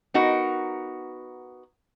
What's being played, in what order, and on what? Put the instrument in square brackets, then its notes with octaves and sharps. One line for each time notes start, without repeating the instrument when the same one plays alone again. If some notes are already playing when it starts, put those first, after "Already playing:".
[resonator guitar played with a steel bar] B3 D#4 F#4 A#4